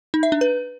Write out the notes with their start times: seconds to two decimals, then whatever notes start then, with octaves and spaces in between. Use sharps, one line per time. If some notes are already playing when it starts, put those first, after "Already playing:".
0.14 D#4
0.23 E5
0.32 D4
0.41 B4